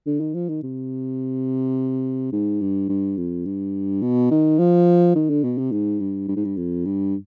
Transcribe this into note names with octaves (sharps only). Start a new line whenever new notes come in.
D3
D#3
F3
D#3
C3
G#2
G2
G2
F2
G2
B2
D#3
F3
D#3
D3
B2
C3
G#2
G2
G2
G#2
G2
F2
G2